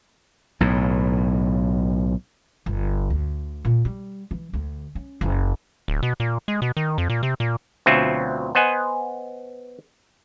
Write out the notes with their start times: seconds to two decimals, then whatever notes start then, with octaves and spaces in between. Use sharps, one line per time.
0.60 B1 A2
2.66 G1
3.10 D2
3.65 A#2
3.85 G3
4.31 E3
4.53 D2
4.95 C#4
5.21 F#1
5.88 D1
6.03 B2
6.20 A#2
6.48 G#3
6.62 B2
6.77 D#3
6.98 F2
7.10 A#2
7.23 C3
7.40 A#2
7.86 D2 B2 F#3 C4 F4 E5
8.55 B3 C5 D#5 F#5 G#5